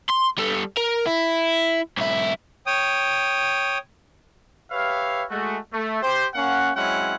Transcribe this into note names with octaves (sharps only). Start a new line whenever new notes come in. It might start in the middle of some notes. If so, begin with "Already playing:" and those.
C6
G3 A4
A#4
E4
B1 E4
C#5 G5 D#6
G4 B4 C#5 E5 F5
G#3 A3 F#4
A3
G4 C5
A#3 C#4 F5 F#5
F#3 G#3 C4 C#4 E4 F#5